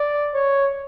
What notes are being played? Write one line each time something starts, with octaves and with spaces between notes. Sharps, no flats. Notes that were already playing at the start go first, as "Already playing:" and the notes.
Already playing: D5
C#5